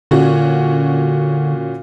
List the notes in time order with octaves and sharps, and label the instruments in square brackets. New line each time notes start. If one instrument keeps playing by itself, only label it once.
[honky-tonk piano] A#2 C#4 F#4 [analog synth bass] D3